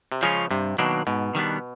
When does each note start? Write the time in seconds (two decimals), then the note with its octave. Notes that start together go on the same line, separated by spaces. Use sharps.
0.12 C3
0.22 C#3 F3 G#3 C#4 F4
0.51 G2 C3
0.78 B2 D#3 F#3 A#3 D4
1.07 G#2 B2
1.35 D#3 G3 B3 D4